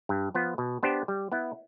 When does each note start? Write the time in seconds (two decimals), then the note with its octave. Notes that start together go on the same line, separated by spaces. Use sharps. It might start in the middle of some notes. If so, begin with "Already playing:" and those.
0.09 G2
0.34 F3 B3 F4
0.58 B2
0.83 B3 D4 G4 C5
1.08 G3
1.32 B3 E4